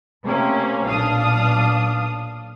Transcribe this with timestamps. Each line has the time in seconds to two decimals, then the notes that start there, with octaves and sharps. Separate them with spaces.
0.24 C3 A3 A#3 C#4
0.86 B1 A#2 D4 F5 D#6